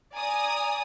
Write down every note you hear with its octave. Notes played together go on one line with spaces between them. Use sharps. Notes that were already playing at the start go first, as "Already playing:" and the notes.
D5 G#5 A#5 D#6